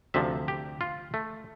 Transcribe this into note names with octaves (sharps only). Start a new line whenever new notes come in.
D2 C3 F3 E5
G4
F4
A3